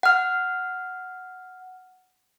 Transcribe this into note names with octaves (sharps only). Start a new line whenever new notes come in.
F#5 F6